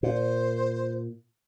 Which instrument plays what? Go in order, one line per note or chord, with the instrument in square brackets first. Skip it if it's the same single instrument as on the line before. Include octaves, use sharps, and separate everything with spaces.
[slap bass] A#2 [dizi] C5